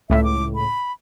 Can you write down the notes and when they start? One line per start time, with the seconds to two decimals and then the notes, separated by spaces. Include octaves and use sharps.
0.10 C#2 A2 E5
0.24 D6
0.55 B5